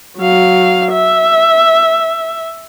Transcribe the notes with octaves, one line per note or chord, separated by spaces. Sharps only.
F#3 F5
E5